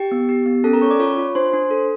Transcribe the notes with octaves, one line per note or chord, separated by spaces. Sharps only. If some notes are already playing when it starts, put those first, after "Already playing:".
Already playing: G4 G5
B3
G4
B3
C#4 A4 A5
A#4 A#5
C#4 C#5 C#6
D5 D6
F4 C#5 C#6
F4
D4 C5 C6
D4
A4